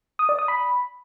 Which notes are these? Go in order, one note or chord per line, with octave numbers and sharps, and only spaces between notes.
D#6
D5
D#6
B5